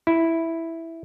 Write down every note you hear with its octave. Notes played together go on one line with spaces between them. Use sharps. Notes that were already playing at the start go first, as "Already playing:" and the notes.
E4